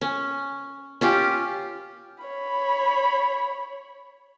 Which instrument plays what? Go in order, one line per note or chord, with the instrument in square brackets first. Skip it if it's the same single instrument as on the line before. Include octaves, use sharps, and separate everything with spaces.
[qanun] C#4
C#4 F4 G4
[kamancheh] C#5 B5